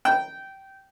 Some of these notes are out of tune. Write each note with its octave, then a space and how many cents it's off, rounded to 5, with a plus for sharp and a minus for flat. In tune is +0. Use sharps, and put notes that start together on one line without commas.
G5 -15